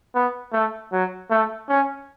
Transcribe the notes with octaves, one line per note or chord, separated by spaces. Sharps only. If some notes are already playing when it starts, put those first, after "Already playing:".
B3
A3
F#3
A3
C#4